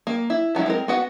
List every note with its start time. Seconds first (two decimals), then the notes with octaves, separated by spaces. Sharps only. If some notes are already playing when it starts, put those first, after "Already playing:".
0.07 A#3
0.30 E4
0.55 F3 F#3 G#3 E4
0.66 G#3 C4 A#4
0.88 B3 F#4 F#5